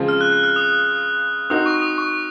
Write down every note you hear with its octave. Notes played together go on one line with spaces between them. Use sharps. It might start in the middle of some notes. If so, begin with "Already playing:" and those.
Already playing: C#3 F3 G#3 C4
F6
F#6
F#6
F6
D#6
C4 D#4 F#4 D#6
C#6
D#6
C#6